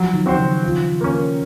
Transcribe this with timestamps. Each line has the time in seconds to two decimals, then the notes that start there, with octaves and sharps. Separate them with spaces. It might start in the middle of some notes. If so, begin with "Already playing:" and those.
Already playing: F3 F#3
0.14 D#3
0.26 C4 F#4 C5
0.38 C#3
0.63 F3
1.01 A#3 C#4